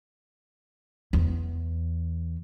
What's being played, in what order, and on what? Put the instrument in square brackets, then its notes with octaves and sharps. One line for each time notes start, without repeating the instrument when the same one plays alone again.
[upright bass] E2